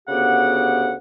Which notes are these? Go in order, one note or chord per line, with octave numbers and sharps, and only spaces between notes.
D2 C#3 B3 G4 F#5